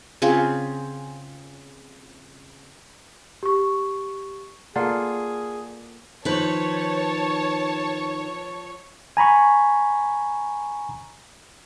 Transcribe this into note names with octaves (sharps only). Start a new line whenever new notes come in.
C#3 C4 F4 G#4
G4 C#6
A#3 F4 G#4 A4 D5 F#5
D#3 F3 D#4 B4 C#5 A5
G#5 A#5 B5 C#6